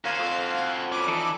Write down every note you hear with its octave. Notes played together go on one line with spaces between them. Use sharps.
A#3 C#4 F#4 C5 F5
F2
C#4 B4 D6
E3 D#4 A4 D5